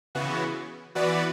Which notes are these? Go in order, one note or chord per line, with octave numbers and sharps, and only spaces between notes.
C#3 E3 B3 F#4
E3 B3 F#4 B4 D5